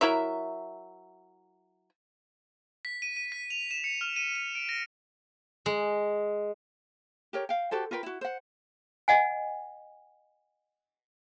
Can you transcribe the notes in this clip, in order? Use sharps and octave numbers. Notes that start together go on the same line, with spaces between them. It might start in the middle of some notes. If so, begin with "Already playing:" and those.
F#3 E4 A#4 E5
B6
D#7
D#7
B6
F7
E7
C#7
F6
D#7
D#7
D7
A#6
G#3
G4 A#4 C#5
F5 G5
F#4 G4 A4 C5
F4 A#4 B4 G5
E4 F#4
C5 F#5
D#5 F#5 G#5